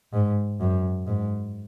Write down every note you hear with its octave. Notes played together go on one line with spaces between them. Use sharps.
G#2
F#2
G#2